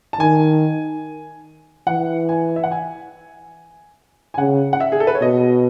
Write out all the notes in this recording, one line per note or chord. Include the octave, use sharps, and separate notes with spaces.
A5
D#3 G#5
E3 F#5
G#5
E5
F#5
G#5
G#5
C#3 F#5
F#5
E5
G#4
A4
B4
C#5
B2 D#5